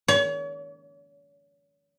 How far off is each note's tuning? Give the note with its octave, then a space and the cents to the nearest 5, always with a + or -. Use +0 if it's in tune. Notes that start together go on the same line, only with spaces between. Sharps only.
C#5 +40